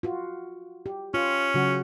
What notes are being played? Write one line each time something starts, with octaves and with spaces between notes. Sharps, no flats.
F4 F#4
G4
C#4 F4
C#3 F#3 F#4